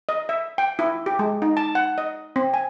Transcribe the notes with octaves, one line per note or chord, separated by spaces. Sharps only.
D#5
E5
G5
E4
G4
G#3
D#4
A5
F#5
D#5
C4
G#5